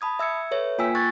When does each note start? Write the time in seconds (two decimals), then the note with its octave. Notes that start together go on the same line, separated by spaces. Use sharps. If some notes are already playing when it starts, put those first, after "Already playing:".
0.01 A5 B5 D#6 G#6
0.19 E5 E6 G#6 C#7
0.51 A4 B4 C#5 E5
0.78 A#3 F4 G5 G#5 E6 B6
0.95 C#6 F#6 G#6 A6